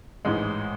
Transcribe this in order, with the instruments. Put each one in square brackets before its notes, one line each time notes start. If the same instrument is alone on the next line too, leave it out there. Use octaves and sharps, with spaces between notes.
[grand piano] A1 G#2 E3 G#3